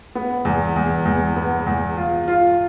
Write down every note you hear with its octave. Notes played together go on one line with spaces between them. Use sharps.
B3
E2
E2
E2
B3
E2
F4
F4